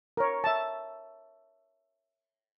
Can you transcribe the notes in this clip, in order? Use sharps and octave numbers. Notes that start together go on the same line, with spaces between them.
A#4 C#5
E5 A5